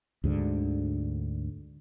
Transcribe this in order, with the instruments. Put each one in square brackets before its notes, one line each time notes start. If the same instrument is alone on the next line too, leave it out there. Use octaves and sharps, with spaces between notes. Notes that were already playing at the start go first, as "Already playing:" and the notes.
[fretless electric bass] D2 G#2 D3